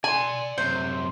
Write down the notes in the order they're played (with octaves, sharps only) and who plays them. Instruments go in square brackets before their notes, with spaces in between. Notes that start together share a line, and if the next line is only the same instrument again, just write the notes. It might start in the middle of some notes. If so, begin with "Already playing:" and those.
[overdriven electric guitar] D5 C6 [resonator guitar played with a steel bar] G#5
[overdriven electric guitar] F#2 C3 [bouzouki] C5